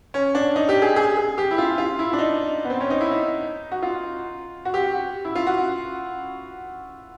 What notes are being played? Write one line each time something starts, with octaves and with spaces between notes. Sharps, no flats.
C#4
D4
D#4
G4
G#4
G#4
G#4
G4
E4
F4
F4
E4
D4
D#4
B3
C4
C#4
D#4
E4
D#4
F#4
F4
F#4
G4
F#4
E4
F4
F#4